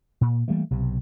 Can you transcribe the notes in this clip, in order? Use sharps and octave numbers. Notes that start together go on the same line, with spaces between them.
A#2
E3 G3 A3 A#3
B1 C3